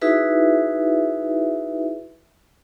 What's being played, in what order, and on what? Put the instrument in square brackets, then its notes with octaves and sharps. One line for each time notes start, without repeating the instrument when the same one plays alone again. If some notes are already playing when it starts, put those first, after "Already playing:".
[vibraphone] D#4 E4 F#4 G#4 B4 E5